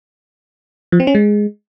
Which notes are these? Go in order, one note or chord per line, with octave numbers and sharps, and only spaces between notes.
F3
C4
C#4
G#3